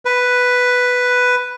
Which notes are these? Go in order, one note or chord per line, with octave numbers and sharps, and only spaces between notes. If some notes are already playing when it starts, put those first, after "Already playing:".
B4